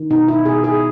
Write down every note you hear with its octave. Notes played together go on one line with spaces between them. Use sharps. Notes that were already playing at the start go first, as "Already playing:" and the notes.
Already playing: D#3
B2 D#4
E4
B2 G#4
G#4